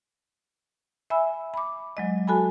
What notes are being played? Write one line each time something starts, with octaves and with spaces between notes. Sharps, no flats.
E5 G#5 B5 E6
B5 D6
F#3 G#3 D#5
F#4 A4 G#5 A5 B5